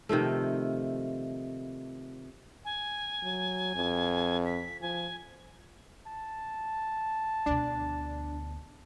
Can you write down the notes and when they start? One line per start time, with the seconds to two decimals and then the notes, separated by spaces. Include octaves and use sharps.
0.09 C3 D#3 F3 A3
2.65 G#5
3.23 F#3
3.75 F2
4.45 B6
4.81 F3 G#5
6.07 A5
7.46 D2 B2 D4